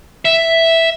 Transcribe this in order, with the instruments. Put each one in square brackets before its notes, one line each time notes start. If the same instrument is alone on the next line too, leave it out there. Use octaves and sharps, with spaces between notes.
[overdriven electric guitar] E5